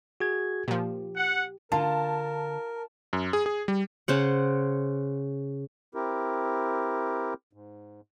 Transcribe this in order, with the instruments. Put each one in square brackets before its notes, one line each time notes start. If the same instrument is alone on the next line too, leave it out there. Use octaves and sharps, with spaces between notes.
[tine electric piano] F#4 G#4 G#6
[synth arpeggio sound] A#2 F3 [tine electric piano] G4
[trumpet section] F#5
[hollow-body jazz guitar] D3 [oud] F4 [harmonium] A#4 [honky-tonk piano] A5
[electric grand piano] F#2
G#4
G#4
G3
[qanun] C#3 C5 F#5
[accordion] C4 E4 G4 A#4
G#2